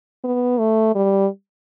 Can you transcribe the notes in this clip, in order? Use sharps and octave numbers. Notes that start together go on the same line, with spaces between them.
B3
A3
G3